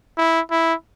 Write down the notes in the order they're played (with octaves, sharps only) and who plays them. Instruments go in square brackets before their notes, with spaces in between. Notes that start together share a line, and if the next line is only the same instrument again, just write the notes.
[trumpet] E4
E4